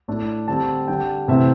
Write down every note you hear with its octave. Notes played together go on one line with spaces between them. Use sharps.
A2 A3 D4
D3 G3 C4 A5
D3 G3 D4 G5
C3 E3 A3 C4 E5